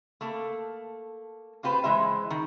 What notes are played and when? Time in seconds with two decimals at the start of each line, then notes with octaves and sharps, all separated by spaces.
0.21 A3 A#3 A4
1.63 A#3 F4 G4 B4 C5
1.84 E3 G#3 C5 E5
2.30 D#3